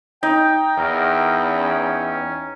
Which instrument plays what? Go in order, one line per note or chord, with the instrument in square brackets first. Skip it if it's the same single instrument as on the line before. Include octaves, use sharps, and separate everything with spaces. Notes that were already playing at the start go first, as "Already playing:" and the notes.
[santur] D#4 [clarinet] G5
[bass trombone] E2 [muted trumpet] A#4
[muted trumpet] C#4